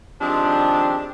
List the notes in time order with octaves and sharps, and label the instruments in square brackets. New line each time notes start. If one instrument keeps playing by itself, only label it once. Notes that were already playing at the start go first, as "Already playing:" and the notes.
[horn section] D#3 F3 G#3 [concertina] C4 G4 [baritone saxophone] D4